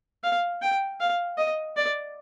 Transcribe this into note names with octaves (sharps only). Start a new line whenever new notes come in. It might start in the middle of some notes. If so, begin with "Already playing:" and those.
F5
G5
F5
D#5
D5